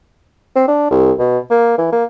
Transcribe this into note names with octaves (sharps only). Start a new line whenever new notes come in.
C4
D4
C2
B2
A#3
E3
A#3